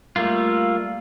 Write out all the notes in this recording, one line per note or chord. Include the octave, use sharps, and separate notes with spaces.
G3 A3 A#3 F4